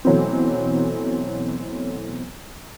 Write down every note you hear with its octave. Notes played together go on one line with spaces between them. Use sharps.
B2 E3 F#3 A3 C4